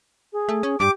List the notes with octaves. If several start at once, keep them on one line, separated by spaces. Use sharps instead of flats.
G#4
A3
C#4
G2 G4 D6